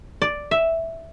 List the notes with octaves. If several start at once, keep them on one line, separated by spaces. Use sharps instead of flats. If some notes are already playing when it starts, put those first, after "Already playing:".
D5
E5